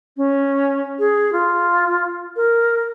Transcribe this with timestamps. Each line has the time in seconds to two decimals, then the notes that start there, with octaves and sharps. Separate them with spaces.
0.17 C#4
0.99 G#4
1.33 F4
2.36 A#4